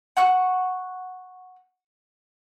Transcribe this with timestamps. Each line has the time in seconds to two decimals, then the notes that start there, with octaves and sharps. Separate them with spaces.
0.17 F#5 C#6 F#6